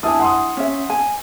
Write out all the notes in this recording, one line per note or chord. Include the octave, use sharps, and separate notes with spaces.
D4 E4 E5 G#5 A5 D#6
F#5 C6 D#6
C#4 E5
G#5